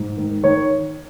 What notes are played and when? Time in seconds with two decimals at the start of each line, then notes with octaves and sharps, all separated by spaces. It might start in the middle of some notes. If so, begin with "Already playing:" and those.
Already playing: G#2
0.17 D#3
0.43 D#3 C#5